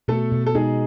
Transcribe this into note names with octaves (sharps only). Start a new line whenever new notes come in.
B2 A3 A4
B2
A4
G#3 D#4 G#4